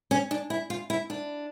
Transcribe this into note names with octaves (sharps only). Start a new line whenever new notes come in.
C#4
D4
E4
F4
E4
D4